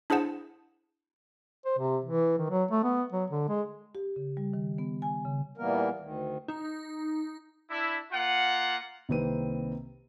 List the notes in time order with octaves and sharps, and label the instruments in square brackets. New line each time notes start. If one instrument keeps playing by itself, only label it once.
[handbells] D4 E4 G#4 C5 F#5 A5
[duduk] C5
C3
E3
D#3
F#3
A3
B3
F#3
D3
G#3
[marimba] G4
C#3
G3
D#3
B3
G#5
C#3
[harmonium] A#2 E3 G3 A#3 B3 A#4
D2 D#3
[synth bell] D#4
[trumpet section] D4 E4
A#3 F4 F#5
[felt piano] C2 D#3 A#3 C4 B4 D#7